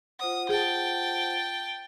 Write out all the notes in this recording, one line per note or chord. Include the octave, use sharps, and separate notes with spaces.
F4 C5 F#5 D#6
G#4 G5 A5